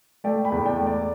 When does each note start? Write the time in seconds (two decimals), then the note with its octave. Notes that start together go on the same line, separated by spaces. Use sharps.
0.24 A3 D5 G5
0.45 G5 B5
0.52 E2
0.66 D5 G5
0.79 A3
0.87 D5